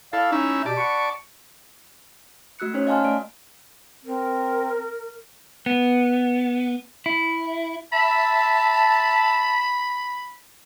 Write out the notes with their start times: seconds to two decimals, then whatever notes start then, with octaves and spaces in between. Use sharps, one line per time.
0.13 E4 A4 D5 F5
0.32 C#4 D#4 E4 E5
0.66 B2 G4 D5 A5
0.77 F#5 B5 C#6
2.59 A3 F#4 E6 F#6 C#7
2.74 C#4 D#4 C5 C#5
2.87 D#5 F5 G#5 A5 C6 F6
3.04 A3 D5 D7
4.05 C4 A#4
5.66 B3
7.06 E4
7.93 E5 A5 B5